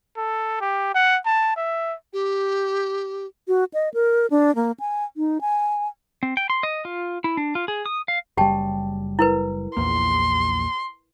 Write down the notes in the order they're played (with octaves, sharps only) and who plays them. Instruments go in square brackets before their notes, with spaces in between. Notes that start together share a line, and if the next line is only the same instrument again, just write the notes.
[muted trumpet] A4
G4
F#5
A5
E5
[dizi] G4
[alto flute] F#4
D#5
A#4
D4
A#3
G#5
D#4
G#5
[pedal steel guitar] C4
G5
C6
D#5
F4
E4
D4
F4
G#4
D#6
F5
[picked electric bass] F#1 G3 [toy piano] G4 G5 A5
[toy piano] E4 A#4 B4
[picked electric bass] A#1 E2 A#3 [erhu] C6